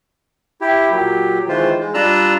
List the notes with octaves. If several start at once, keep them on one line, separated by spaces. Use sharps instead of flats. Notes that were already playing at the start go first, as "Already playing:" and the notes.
E4 G4
A#2 F#3 G4
D#3 E3 G#3 F4 C5
G#3
G3 D4 F4 A#5 E6 F#6